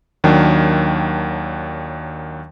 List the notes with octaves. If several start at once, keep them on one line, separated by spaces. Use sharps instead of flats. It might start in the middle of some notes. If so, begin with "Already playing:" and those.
D#2 D#3 F#3 D4 G5